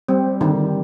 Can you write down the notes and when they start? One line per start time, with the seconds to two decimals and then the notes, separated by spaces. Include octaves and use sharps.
0.09 G3 C4
0.41 D3 D#3